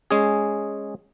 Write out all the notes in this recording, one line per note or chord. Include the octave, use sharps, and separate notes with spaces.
G#3 C#4 G#4